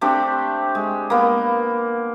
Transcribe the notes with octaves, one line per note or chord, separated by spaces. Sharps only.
A3 C4 D4 G4
G#3
A#3 B3